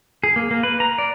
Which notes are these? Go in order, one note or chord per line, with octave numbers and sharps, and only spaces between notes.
G#4
A#3
A#3
B4
A#5
D5